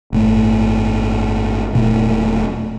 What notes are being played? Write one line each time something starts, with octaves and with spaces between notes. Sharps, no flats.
G1 A2 A3
E1 A#2 A3